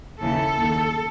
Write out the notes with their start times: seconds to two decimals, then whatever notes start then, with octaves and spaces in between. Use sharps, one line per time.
0.21 D#2 C#3 E3 A4
0.58 D#2 D#3